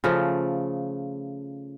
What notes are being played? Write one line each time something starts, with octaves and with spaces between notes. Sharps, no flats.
C#3 F3 A3